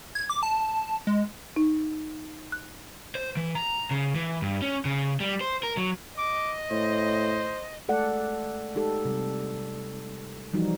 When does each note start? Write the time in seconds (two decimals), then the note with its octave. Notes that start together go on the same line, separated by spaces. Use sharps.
0.15 G#6
0.30 D6
0.43 A5
1.07 G#3
1.56 D#4
2.52 F#6
3.15 C5
3.37 E3
3.55 A#5
3.91 C#3
4.15 E3
4.42 G2
4.62 C#4
4.85 C#3
5.20 G3
5.41 C5
5.63 A#4
5.77 F#3
6.18 D#5 D6
6.71 A2 C5
7.88 G#3 A3 A4 D5 F#5
8.75 G#3 D#4 G4 A4
9.05 C3 G3
10.53 E3 F3 G3 D#4 F#4